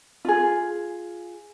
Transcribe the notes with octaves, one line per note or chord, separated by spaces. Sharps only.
F4 G#4